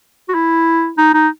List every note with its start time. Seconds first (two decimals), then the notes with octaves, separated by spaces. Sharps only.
0.29 F#4
0.34 E4
0.98 D#4
1.14 D#4